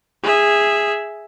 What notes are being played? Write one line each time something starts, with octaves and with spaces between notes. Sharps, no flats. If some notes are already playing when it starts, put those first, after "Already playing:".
G#4 E5